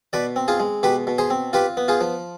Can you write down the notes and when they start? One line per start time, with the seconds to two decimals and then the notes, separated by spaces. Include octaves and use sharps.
0.13 B2 B4 D5
0.36 C4
0.48 F4 G#4
0.60 G#3
0.83 B2 G4 B4
1.07 B2
1.18 G#4 C5
1.30 C4
1.53 F4 G4 B4
1.77 B3
1.88 F4 G#4
2.01 F3